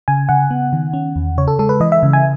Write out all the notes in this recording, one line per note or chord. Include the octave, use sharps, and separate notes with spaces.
C#3 G#5
C#3 F#5
B3
D#3
C#4
E2
C#3 C#5
A4
G#3 A4
B4
E3 D#5
E5
C#3
G#5